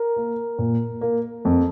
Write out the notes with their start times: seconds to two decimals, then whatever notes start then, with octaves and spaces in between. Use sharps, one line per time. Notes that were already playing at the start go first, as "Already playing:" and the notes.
Already playing: A#4
0.16 A#3
0.59 A#2
1.01 A#3
1.45 F2